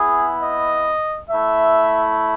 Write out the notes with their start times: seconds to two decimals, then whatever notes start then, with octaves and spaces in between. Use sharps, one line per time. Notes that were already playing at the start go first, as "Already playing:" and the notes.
Already playing: B3 E4 G#4
0.43 D#5
1.30 A3 E4 E5